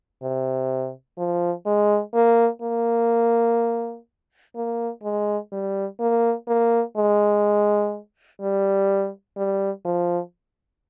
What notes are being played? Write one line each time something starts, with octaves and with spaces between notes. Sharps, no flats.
C3
F3
G#3
A#3
A#3
A#3
G#3
G3
A#3
A#3
G#3
G3
G3
F3